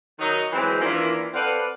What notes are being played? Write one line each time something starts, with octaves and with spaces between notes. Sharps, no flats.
D#3 F#3 D#4
E3 F#3 G#3 C4
D#3 E3 A#3 D4 E4 F4
C4 A4 B4 D5 F5 F#5